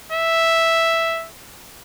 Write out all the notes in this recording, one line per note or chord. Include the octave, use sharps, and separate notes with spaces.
E5